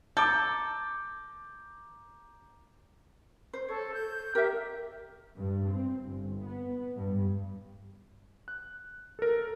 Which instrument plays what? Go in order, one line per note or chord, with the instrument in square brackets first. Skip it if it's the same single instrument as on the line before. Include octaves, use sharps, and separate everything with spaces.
[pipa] A4 [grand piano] A#5 D6 G6
[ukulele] C5
[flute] A4 [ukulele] C#5
[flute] G6
[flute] G4 [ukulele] A#4 E5
[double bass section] G2
C4
G1
B3
G2
[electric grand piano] F#6
A4 A#4